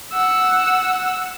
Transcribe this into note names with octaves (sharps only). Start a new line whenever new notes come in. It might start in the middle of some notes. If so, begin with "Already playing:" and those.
F#5 E6